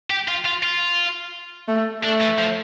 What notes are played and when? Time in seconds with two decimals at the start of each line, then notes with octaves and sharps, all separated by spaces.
0.10 G4
0.28 F4
0.45 F4
0.63 F4
1.68 A3
2.03 A3 D4
2.21 E3
2.38 F3